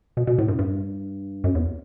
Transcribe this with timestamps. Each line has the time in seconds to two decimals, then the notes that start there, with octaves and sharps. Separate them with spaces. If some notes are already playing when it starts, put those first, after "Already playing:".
0.17 B2
0.27 B2
0.38 A2
0.48 G2
0.59 G2
1.44 F#2
1.55 E2